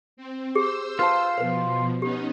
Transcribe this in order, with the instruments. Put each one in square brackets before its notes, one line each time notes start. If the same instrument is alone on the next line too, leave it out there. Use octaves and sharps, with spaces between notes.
[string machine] C4
[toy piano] G4 G#4 [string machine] C5 E6
[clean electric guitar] F4 [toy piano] B4 A5
[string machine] B2 F3 [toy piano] B4 C5
[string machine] B3 C#4 D#4 [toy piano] G4